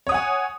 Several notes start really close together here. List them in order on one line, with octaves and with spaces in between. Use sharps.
C#5 D#6 F#5 G#5